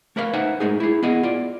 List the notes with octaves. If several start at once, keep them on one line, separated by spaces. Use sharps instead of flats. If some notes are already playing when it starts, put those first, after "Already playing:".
A3 A#4 B4 C#5 F5
D#4 B4 C5 E5 F#5 G#5
G#3 A3 D#4 G#4
E4 G#4
B3 E4 G#4 D#5
F4 D5